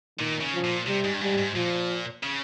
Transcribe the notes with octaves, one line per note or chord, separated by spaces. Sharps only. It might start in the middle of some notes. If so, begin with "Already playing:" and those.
A#2 D#3
C#3
F3
A#2
C3 G3
G#2
G2
G#2 G3
G#2
A#2 F3
C#3